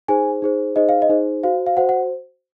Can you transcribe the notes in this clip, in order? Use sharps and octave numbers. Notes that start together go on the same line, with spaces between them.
D#4 G#4 C5 G#5
D#4 G#4 C5
D#4 G#4 C5 D#5
F5
D#5
D#4 G#4 C5
F#4 C5 F5
F5
F#4 C5 F#5
F#5